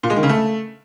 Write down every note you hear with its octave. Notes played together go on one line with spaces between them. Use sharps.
A#2
G#3
D#3
C#3
A3